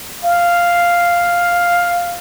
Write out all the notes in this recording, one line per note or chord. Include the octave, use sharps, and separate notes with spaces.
F5